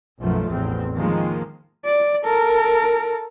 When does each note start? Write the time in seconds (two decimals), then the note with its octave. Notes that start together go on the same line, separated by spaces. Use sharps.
0.19 B1 F#2 B2 F3 A3
0.48 A1 E2 C4
0.94 D#3 F3 G#3 A#3
1.85 D5
2.24 A4 A#4